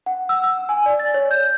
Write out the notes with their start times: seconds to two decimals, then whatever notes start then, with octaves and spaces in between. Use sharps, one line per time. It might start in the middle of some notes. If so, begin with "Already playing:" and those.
0.06 F#5
0.29 E6
0.44 E6
0.69 G#5
0.86 D5
0.99 A6
1.14 C#5
1.31 G6